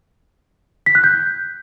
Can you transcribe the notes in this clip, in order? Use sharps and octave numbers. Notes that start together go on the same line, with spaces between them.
B6
F#6
G6